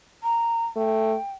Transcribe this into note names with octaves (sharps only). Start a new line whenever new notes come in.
A#5
A3 G5